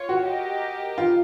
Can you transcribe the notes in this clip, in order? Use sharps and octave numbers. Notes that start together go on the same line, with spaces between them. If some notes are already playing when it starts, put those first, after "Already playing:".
Already playing: F4 C#5
F#4
G4 A#4 D#5 G5
F4